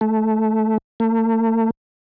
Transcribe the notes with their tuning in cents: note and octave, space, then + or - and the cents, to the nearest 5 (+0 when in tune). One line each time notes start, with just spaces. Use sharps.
A3 -10
A3 +45